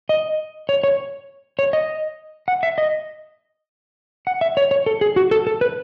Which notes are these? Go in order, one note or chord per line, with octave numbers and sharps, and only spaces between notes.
D#5
C#5
C#5
C#5
D#5
F#5
E5
D#5
F#5
E5
C#5
C#5
A4
G#4
F#4
A4
A4
B4